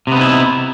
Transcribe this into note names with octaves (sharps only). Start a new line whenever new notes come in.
C3 B3 D#4 E4